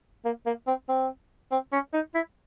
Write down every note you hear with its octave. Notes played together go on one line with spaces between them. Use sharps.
A#3
A#3
C4
C4
C4
C#4
D#4
E4